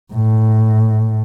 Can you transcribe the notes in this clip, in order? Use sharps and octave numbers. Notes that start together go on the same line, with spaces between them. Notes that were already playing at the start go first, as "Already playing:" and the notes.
A2